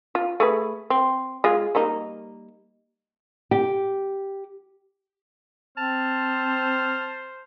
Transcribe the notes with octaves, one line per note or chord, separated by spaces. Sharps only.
F4
A3 G#4 B4
C4
G#3 F4 G#4
G3 A#3 D#4
G4
C4 C5 A5 F6